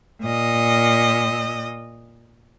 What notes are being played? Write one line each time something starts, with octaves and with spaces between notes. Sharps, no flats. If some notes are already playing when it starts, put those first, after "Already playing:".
A#2 D#5